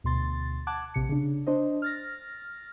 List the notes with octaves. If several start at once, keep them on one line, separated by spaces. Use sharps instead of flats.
D2 B2 C6 A6
F#5 A5 D6 F#6 G#6
A#1 C3 C#7
C#3 D4
D4 C5 D#5
F6 A6 A#6